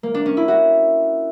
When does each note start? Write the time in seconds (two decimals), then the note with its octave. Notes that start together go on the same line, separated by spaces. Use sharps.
0.03 A#3
0.14 D4
0.26 C#4
0.37 E4
0.48 F#4